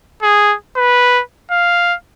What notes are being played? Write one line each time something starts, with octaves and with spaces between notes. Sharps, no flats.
G#4
B4
F5